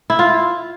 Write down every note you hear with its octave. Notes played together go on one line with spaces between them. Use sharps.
E4
F4